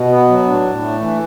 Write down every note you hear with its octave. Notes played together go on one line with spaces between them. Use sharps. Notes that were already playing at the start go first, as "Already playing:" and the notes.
Already playing: B2
B3
F#3
A2 D4
A2
A3
E3